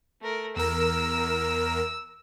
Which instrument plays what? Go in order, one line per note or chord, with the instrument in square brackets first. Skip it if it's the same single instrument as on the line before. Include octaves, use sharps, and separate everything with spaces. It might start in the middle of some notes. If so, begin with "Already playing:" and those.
[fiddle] A3 A#4
[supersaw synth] E2 A#4 [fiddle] E6